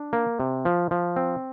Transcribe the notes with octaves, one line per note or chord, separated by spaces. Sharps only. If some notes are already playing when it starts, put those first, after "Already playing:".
Already playing: D4
A#3
C3
F3
F3
C4